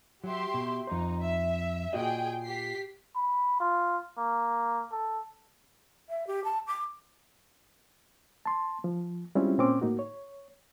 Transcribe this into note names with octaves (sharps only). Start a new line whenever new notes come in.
F#3 G4 E5 C6
B2
F2 D#4 C5
E5
A#2 F#4 G#4 D#5 G5
G4 B6 C7
B5
F4
A#3
A4
E5
G4
A5
D6
A5 C6
F3
G3 G#3 C4 C#4 E4 F4
A#2 C4 C#4 D6
A2 A#3 D#4 F#4
C#5